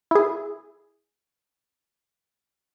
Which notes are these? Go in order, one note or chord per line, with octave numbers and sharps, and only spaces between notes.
E4 G#4